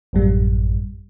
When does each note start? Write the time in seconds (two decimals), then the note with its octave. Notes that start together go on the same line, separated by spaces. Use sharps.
0.13 A1 F#2 G3